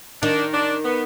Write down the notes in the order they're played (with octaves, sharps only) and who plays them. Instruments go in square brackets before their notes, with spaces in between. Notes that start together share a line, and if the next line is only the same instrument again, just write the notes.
[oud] D#3 [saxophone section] D4
[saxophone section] D4
B3